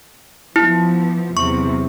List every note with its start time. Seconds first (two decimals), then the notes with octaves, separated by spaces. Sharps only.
0.56 E3 F3 B3 E4
1.37 E2 C3 F#3 C#6